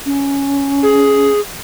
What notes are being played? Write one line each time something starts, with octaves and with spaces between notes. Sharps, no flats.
C#4
G#4